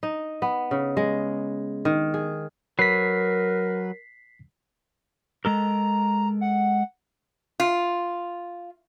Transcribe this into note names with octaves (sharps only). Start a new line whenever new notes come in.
D#4
B3
C#3
G#3
D#3
G#4
F#3 A#4 B4 B6 C7
G#3 A4 A#4 A#5
F#5
F4